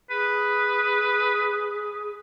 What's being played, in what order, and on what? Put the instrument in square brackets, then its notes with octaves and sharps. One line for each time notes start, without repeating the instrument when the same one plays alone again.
[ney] G#4 [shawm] B4